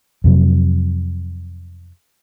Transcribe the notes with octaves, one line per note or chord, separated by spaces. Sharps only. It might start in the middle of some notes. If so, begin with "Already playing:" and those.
F2 C3 F#3